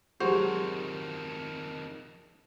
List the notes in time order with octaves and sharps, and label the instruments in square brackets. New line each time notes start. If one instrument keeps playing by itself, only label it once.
[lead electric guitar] F2 D#3 [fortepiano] F#3 G#3 F#4 [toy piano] G4 [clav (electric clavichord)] C5